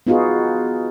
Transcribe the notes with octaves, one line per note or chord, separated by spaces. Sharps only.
B3 D#4 F4 F#4 G#4